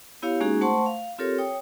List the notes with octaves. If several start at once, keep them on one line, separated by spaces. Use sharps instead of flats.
B3 E4 G4 C#5 F5
G#3 A#3 C#4 D#4 F#4 G#4
A3 C5 F#5 A5 C6 C#6
F5
C4 F4 G4 A4 A#4 C#5
C#5 G5 D#6